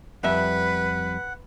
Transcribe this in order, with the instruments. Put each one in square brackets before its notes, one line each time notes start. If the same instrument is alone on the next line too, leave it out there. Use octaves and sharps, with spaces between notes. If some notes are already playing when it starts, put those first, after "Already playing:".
[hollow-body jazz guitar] F2 G3 E5 [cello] B4 [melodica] F#5